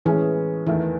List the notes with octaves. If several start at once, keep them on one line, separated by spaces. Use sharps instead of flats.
A2 E3 G#3 C#4 G#4
E2 D#3 E3 A3